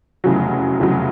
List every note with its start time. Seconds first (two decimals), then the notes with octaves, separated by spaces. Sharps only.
0.24 F1 E2 C#3 F#3
0.80 F1 E2 C#3 F#3